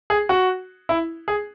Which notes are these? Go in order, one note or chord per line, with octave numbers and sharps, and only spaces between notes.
G#4
F#4
E4
G#4